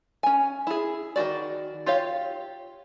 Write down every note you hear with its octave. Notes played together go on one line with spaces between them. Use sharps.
C#4 G#5
E4 G#4
D#3 A#3 F#4 D5
F4 G4 C#5 F5